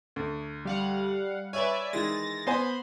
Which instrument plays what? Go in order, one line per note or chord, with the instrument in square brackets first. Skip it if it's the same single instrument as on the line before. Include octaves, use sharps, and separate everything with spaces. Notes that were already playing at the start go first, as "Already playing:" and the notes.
[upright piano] D2
[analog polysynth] G3 F5 F#5
[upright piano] B4 C#5 [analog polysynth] D5 E5 G#5
[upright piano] D#3 E3 G#3 [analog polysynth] A6 A#6
[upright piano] B3 C5 G#5 [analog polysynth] B5 C6